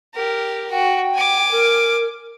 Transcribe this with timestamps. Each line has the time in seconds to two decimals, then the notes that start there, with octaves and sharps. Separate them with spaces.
0.14 G4 A#4
0.71 F#4 G5
1.14 G#5 D6
1.51 A#4